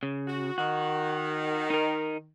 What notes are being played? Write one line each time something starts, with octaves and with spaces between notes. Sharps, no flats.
C#3
F#4
D#3 F#4
D#4 A#4